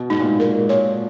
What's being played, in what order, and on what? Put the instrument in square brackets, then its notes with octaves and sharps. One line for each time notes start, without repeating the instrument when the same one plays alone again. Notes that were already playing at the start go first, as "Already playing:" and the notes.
Already playing: [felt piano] B2
[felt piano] G#2 [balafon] D#4
[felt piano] A#2
G#2
[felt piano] G#2 [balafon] A#4
[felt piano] A#2 [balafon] C#5